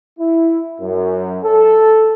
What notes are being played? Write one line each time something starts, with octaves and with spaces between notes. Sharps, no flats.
E4
F#2
A4